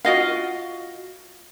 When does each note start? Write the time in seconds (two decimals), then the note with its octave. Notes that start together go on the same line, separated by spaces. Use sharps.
0.05 F4 F#4 D#5 F5